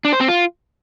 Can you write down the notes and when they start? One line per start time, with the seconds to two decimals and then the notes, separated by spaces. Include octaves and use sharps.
0.05 D4
0.13 C5
0.21 C4
0.28 F4